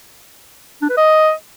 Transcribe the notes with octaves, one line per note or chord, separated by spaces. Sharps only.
D4
B4
D#5